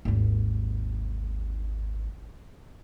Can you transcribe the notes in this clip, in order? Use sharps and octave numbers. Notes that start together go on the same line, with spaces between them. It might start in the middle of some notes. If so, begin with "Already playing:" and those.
G#1 D#2